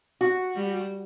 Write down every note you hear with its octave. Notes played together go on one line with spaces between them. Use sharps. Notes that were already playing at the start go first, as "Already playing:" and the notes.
F#4
G3